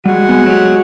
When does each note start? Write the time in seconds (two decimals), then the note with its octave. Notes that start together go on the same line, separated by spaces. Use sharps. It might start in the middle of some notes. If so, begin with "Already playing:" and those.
0.06 G3 G#3 F#4
0.29 B3 G#5
0.46 F#3 G4